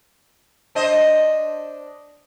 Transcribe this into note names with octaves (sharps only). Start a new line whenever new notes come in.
D4 C5 D#5